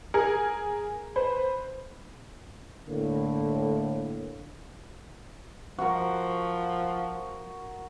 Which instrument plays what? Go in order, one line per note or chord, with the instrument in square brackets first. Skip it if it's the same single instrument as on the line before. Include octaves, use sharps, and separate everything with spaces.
[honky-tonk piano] G#4 A#4
B4 C5
[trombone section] A2 A#3 [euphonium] D3
[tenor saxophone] F3 [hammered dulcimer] F#4 A#4